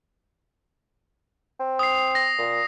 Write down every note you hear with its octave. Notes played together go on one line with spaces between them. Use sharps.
C4
D#6 C7
A#6
A#2